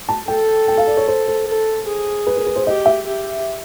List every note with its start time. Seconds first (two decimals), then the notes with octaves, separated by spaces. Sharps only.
0.09 A5
0.28 A4 G5
0.68 G5
0.78 F5
0.87 D5
0.97 C#5
1.08 C5
1.27 C5
1.47 A4
1.87 G#4
2.27 B4
2.37 A#4
2.46 B4
2.56 C5
2.66 G4 D#5
2.86 E5
3.06 G4